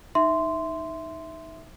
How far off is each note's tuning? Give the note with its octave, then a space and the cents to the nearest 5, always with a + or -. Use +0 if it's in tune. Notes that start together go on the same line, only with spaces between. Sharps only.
D#4 +0 E5 +0 C6 -10